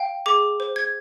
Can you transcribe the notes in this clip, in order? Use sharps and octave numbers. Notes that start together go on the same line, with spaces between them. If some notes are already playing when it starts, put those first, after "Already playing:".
Already playing: F5 G5
G#4 D6
C5
G#6